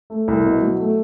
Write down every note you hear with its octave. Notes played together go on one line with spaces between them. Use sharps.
A3
C2
B2
F#3
A3